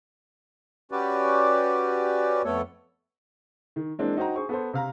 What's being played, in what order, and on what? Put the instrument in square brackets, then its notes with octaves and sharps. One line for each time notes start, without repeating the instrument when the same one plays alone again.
[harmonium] C#4 F#4 G4 B4 D5
F2 A3 B3 A4 C#5
[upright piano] D#3
E3 G#3 A#3 C4 D4
D#4 F#4 C5 G5 A#5
G#4 C5 C#6
B3 A4 C5
C3 F5 A#5